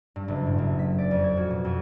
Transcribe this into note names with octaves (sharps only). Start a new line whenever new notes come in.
G2
F#1
A2
F#1
B6
D5
F2
G#6
F#4
B2
F2